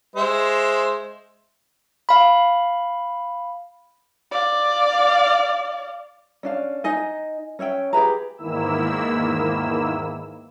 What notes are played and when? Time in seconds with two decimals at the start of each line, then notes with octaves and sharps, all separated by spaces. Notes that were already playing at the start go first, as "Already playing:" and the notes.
0.16 G#3 C5 E5
2.09 F5 B5
4.32 D5 F5
6.43 C#4 D4 F5
6.84 D#4 D#5 G#5
7.59 C#4 C#5 E5 G5
7.93 G4 G#4 B4 A#5
8.37 E2 G#2 D#3 A#3 E4 E6